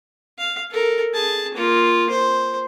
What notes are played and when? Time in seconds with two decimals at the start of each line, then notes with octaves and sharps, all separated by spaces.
0.38 F5
0.71 A4 A#4
1.13 G#4 A5
1.54 A#3 F4
2.10 C5